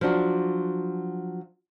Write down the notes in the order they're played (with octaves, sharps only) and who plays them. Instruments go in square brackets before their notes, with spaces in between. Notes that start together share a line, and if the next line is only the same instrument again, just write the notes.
[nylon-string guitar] F3 F#3 D4 F#4